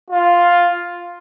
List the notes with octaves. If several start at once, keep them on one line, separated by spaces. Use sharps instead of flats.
F4